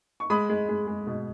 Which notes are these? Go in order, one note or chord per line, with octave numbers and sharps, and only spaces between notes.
C#6
G#3 B5 D#6
G#3
G#3
G#3
B2